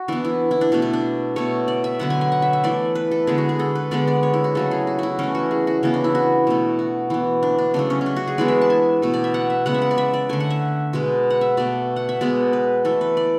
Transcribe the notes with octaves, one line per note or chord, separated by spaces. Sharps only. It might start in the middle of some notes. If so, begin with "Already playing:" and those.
Already playing: F#4
E3 B3 D4
E4
E4
D4
B2 A3 D4
D4
D4
B2 A3 C#5
D5
E5
D3 F#3 B3 F#5
G#5
G#5
F#5
E5
E5
E3 A3 D5
B4
A4
D3 G#3 B3 G#4
F#4
G#4
A4
B4
D3 G#3 B3 D5
D5
C#5
E4
F#4
C#3 F#3 A3 A4
G#4
F#4
E4 F#4
E3 A3 C#4
F#4
G#4
F#4
C#3 E3 B3 C#4
D4
E4
F#4
B2 A3
F#4
E3 B3
D4
D4
C#3 F#3 A3 D4
C#4
C#4
D4
F#4
G#4
E3 G#3 B3 D5
E5
A5
G#5
B2 A3
D5
E5
F#5
E5
C#3 G#3 B3 F#5
E5
F#5
D5
E5
D5
D3 A3 G#5
F#5
E5
B2 G#3 B3
F#5
E5
B2 A3 D5
F#5
E5
B2 G#3 B3 D5
B4
E3 A3 A4
B4
D5